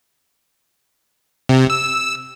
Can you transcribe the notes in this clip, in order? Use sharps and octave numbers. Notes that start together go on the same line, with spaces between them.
C3
E6